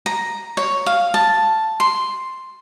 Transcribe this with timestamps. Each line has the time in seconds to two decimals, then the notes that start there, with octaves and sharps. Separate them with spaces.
0.06 A#5
0.57 C#5
0.86 F5
1.14 A5
1.80 C6